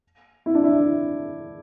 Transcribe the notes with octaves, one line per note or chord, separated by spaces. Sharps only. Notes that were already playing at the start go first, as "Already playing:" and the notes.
E4
D4
E4